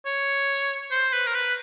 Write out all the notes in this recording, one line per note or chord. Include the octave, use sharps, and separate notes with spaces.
C#5
C5
B4
A#4
B4